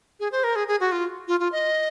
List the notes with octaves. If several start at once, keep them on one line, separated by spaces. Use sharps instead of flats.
G#4
C5
A#4
G#4
G#4
F#4
F4
F4
F4
D#5